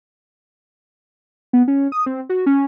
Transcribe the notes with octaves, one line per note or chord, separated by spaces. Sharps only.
B3
C#4
D#6
C4
F#4
C#4